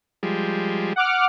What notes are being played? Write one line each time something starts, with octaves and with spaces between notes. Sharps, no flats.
F3 G3 G#3
F#5 D6 F6